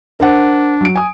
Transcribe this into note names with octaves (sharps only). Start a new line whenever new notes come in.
D4 A#4 C5 F#5
F#3 D7
G#5 D#6